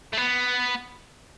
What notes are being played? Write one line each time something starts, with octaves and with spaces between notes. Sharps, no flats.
A3
B3